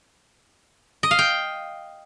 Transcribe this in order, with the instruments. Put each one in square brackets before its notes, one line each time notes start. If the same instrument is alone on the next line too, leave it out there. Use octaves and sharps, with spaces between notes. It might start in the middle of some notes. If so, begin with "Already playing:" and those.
[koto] D#5
F5
G5